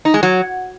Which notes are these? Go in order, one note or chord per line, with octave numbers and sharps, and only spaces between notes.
D#4
G#3
F#3